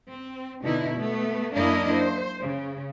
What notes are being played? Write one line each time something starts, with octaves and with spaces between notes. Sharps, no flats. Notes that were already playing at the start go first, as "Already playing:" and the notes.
C4
B2 D3 D#4 E4
A3 B3
F#2 A#3 D4 E4 A#4 D#5
C5
C#3